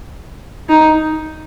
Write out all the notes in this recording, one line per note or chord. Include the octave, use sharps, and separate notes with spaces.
D#4